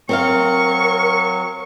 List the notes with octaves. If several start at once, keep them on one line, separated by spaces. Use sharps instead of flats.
F#3 C4 A#4 C5 F5 C#6